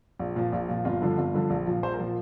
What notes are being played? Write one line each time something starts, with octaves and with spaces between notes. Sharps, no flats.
A#1
A#2 F3
A#1
A#2 F3
G1 F4
G2 D3 F3
G1
G2 D3 F3
A#1
A#2 F3
A#1 C5
A#4
A#2 F3